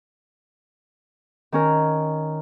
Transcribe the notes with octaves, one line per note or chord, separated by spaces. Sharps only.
D#3 C#4 A#4